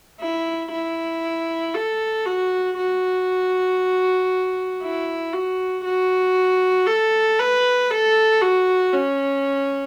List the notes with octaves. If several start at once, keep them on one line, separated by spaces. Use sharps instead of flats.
E4
E4
A4
F#4
F#4
E4
F#4
F#4
A4
B4
A4
F#4
C#4